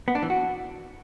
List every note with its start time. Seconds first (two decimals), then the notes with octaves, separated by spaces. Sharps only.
0.08 B3
0.15 D4
0.22 E3
0.30 F#4